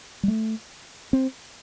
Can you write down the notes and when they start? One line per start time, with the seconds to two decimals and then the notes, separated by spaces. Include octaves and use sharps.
0.23 G3
0.28 A3
1.13 C4